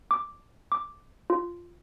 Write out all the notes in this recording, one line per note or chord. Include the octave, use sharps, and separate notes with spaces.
D6
D6
F4